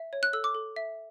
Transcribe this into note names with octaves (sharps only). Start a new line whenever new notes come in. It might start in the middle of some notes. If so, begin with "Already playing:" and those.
Already playing: E5
C#5
F#6
A4 E6
D6
A4
E5